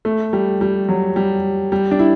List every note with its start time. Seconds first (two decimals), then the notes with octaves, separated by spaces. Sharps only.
0.05 A3
0.33 G3
0.61 G3
0.89 F#3
1.16 G3
1.72 G3
1.91 D4
1.99 E4